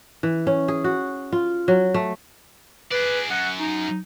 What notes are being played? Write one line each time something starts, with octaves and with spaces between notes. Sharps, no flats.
E3
C#4
G#4
F#4
F4
F#3
A3
G#4 B4 D5
F#2 F#5
D#4